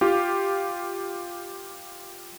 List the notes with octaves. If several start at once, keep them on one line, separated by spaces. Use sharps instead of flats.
F4 G4